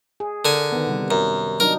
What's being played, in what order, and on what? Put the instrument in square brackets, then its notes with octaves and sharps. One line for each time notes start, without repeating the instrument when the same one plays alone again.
[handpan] G#4
[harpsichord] D3 G#5 [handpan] A#4
[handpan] D#3 B3
C3 G3
[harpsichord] F#2
[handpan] F#3 D4 D#4 [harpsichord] A#4